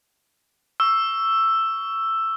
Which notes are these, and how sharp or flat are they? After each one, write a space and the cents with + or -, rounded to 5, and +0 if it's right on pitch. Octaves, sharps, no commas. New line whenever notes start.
C#6 +20 E6 +5